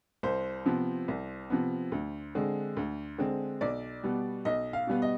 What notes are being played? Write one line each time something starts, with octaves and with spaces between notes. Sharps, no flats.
C2 C5
C3 F3 B3
C2
C3 F3 B3
D2
D3 G#3 C4
D2
D3 G#3 C4
B1 D5
B2 G3 B3
B1 D#5
F5
B2 G3 B3
D#5